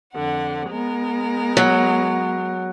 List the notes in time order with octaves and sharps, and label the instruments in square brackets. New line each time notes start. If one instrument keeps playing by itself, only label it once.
[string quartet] F2 D3 F#5
G#3 B3 A#4
[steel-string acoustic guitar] F#3